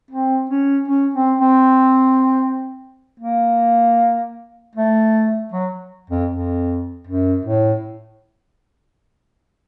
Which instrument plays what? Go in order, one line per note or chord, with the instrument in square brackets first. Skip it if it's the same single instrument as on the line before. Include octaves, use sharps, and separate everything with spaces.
[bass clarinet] C4
C#4
C#4
C4
C4
A#3
A3
F#3
F2
F2
F#2
A2